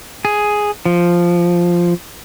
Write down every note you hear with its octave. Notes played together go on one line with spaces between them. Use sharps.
G#4
F3